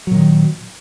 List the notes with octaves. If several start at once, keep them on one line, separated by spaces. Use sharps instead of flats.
A#2 D#3 F#3